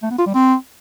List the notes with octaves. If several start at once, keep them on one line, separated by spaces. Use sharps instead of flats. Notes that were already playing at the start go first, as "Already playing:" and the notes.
A3
B3
F4
G3
C4